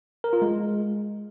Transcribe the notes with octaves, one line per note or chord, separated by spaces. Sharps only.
A#4
F4
G#3